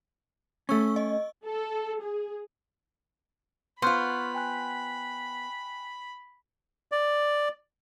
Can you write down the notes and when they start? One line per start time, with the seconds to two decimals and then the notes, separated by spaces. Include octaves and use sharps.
0.69 A3 C#4 C#6 E6
0.96 D#5
1.44 A4
2.00 G#4
3.82 B3 F4 C5 B5 C#6 F6 F#6
4.34 G5 G#5 F#6
6.92 D5